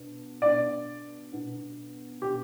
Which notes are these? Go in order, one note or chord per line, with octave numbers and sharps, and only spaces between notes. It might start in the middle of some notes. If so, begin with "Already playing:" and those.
Already playing: B2 D4
B2 B3 D4 D5
B2 B3 D4
B2 B3 D4 G4